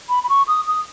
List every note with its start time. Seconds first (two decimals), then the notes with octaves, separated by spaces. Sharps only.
0.09 B5
0.24 B5
0.29 C#6
0.48 D#6
0.67 D#6